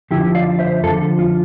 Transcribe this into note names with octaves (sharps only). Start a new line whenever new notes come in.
F2 D3 F3 E4 G4
D5 F5
C5 E5
F2 D3 F3 F4 A4
F4